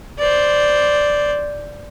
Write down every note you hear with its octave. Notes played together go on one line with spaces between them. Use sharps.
C5 D5